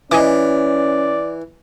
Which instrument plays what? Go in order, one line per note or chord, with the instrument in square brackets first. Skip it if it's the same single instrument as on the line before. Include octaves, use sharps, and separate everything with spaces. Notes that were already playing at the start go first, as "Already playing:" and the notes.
[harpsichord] E3 [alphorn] C#4 [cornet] D5 [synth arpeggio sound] D#5 G#5 D6